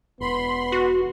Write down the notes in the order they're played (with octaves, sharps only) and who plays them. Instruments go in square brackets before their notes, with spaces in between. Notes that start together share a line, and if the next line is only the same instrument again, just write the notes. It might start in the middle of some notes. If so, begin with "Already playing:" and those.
[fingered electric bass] E1 [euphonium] B3 [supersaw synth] B5 C6
[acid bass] F#4